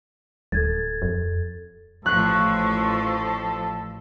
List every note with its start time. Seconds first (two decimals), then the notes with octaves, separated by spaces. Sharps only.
0.52 D1 A4 G#6 A6
1.02 F2
2.06 A1 F3 A4 C#6 F#6